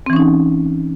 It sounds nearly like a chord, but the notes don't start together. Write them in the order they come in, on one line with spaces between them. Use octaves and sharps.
C4 E3 C#4 D#4